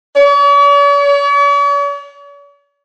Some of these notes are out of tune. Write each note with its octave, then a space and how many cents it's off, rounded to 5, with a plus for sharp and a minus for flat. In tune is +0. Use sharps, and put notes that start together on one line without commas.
C#5 +45